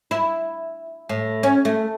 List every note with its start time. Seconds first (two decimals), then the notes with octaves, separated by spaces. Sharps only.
0.11 E4
1.09 A2
1.43 C#4
1.65 A3